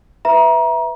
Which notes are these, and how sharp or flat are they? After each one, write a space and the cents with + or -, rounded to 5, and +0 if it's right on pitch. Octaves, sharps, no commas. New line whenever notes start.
B4 +0 E5 +0 A#5 +30